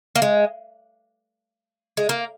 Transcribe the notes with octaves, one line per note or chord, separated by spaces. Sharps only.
A#3
G#3
G#3
A#3